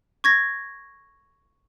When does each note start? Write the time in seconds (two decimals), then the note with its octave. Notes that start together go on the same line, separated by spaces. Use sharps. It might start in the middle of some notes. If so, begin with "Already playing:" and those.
0.24 C#6 G#6 A#6